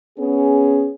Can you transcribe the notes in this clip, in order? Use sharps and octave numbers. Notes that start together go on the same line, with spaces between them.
B3 C#4 G#4